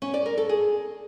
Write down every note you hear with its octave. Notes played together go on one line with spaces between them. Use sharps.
C#4
D5
A#4
A4
G#4